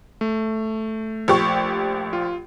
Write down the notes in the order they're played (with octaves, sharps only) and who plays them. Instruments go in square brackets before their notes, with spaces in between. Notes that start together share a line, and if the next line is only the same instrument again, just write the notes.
[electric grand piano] A3
[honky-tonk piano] A#1 G4 C#6
[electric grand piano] F4